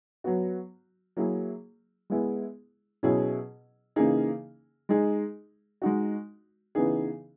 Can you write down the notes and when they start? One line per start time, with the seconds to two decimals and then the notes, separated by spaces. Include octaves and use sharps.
0.24 F#3 B3 F#4
1.17 F#3 A#3 E4 G#4
2.10 G#3 B3 E4 G#4
3.03 B2 F#3 C#4 E4 G#4
3.96 C#3 E3 A#3 D#4 G#4
4.89 G#3 D#4 G#4
5.82 G#3 D#4 F#4
6.75 C#3 E3 B3 D#4 G#4